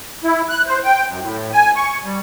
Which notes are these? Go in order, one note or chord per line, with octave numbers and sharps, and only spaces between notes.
E4
F#6
C5
G5
F#2
A2
G#5
C#6
G3